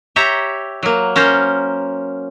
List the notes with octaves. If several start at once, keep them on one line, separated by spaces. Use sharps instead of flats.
G4 C#5 E5 A#5
F#3 A#3
C#4 A#4 C5